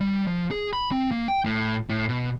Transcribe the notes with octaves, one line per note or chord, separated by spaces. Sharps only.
G3
F3
G#4
B5
C4
A#3
G5
A2
A2
B2